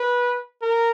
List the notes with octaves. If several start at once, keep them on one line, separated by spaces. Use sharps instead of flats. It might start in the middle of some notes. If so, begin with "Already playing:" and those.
Already playing: B4
A#4